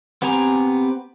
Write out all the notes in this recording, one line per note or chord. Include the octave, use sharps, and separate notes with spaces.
B3 C4 G4 G#5 A#5